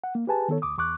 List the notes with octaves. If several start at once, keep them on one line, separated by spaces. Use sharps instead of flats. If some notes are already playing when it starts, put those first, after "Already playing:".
F#5
A#3
G4 G#4 B4 G#5 A5
D#3 B3 A4 C#5
D2 D6 D#6
E2 C#6 D6 F#6